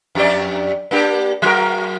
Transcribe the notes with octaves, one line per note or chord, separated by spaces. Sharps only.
F2 G4 D5
A#3 D4 G4
F#3 F#4 A#4